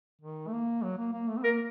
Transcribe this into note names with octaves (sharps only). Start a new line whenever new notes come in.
D#3
A3
A#3
F#3
A#3
A#3
A3
C4
A#3 A#4